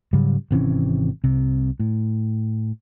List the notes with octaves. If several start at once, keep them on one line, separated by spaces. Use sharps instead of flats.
G#2 C#3 F#3 G3
G#1 C3 E3 C#4
C2 C3
A2